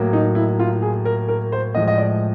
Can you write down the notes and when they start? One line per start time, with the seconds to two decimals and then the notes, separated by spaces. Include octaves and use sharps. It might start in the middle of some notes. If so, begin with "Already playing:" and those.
Already playing: A2 F#3 A#3
0.13 D#4
0.35 E4
0.59 F4
0.82 G#4
1.05 A#4
1.28 A#4
1.52 C5
1.75 A2 F3 G#3 D#5
1.88 D#5
1.98 D5